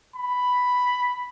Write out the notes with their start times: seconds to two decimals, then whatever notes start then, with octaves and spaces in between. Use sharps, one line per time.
0.16 B5